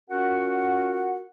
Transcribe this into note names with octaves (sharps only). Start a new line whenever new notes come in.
C#4 F4 F#4 A#4 F#5